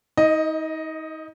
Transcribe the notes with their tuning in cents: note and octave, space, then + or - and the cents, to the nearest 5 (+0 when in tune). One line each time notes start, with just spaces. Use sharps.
D#4 +35 D#5 +0